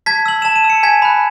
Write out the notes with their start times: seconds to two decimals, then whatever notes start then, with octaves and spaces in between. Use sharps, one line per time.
0.06 A5 G#6 B6
0.26 E6 F#7
0.42 A5 E7
0.56 D#7
0.64 E6
0.70 C#7
0.83 G#5 G#6 B6
1.02 B5 F#6